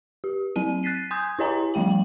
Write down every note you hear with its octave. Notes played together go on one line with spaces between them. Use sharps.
G4
F#3 C4 D#7
F#6 A6 B6 C7 D#7
G#5 C6 D#6 G6 G#6
E4 G4 C#5 D#5 G#5 A#5
F3 G3 A3 G5 F#7